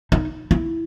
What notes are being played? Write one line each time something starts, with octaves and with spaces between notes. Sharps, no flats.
D#4
E4